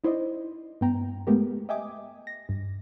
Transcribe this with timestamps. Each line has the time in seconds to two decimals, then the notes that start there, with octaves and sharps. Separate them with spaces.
0.04 D#4 E4 C5 D5 D#5
0.81 G2 B3 G5 A#5
1.27 G#3 A3 B3 G4 A#4
1.69 D#5 E5 G5 G#5 D6 D#6
2.27 A#6
2.49 G2